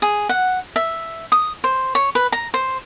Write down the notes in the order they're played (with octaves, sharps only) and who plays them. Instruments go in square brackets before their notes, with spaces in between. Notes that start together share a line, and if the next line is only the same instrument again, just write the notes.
[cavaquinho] G#4
F#5
E5
D#6
C5
C#5
B4
A#5
C5